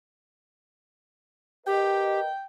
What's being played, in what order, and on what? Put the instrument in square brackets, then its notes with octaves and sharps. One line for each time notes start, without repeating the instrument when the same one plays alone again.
[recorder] G4 [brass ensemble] A#4 B4 D#5 [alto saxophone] G5